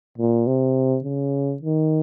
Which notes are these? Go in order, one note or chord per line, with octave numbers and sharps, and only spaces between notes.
A#2
C3
C#3
D#3